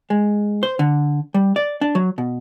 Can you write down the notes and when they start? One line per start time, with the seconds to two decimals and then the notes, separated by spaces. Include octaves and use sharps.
0.10 G#3
0.63 C5
0.79 D3
1.34 G3
1.56 D5
1.81 D4
1.95 F#3
2.18 B2